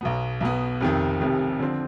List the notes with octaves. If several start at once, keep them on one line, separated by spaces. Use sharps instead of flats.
B1 B2 B3
B1 B2 B3
F1 F2 C3 D#3
F1 F2 C3 D#3
D3 F3 C4